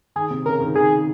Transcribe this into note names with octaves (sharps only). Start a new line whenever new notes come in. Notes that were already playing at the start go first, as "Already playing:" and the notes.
D#3 G#4
C3
C#3 A#4
D#3
D#3 G#4